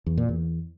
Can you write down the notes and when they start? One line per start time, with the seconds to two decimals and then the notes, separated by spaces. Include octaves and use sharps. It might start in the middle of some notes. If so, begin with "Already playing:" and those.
0.06 E2
0.18 A#2
0.29 E2